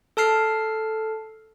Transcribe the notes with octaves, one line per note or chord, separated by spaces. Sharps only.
A4 A5 F6 C7